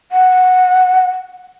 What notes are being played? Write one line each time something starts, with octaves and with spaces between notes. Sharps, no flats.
F#5